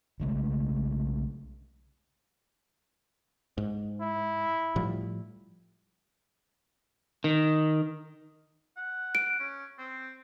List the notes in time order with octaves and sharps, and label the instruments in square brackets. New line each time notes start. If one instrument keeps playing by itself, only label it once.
[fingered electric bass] B1 C#3 G#3 A3
[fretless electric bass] G#2
[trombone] E4
[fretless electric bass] A2 F3 G3
[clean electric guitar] D#3
[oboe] F#5
[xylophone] D7
[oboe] C#4
C4